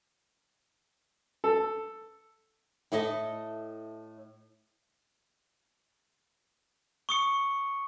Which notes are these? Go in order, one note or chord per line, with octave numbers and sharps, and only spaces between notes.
A4
A2 E4 A4 D#5
C#6 D#6 C#7